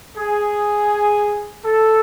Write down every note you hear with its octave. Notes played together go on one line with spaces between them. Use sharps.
G#4
A4